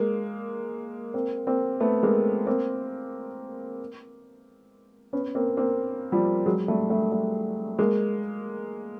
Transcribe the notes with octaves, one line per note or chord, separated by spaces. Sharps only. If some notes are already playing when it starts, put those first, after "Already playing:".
Already playing: G#3 A#3
A#3 C4
A#3 C4
A3 B3
G#3 A#3
A#3 C4
B3 C#4
A#3 C4
A#3 C4
F3 G3
F#3 G#3
G3 A3
G3 A3
G3 A3
G#3 A#3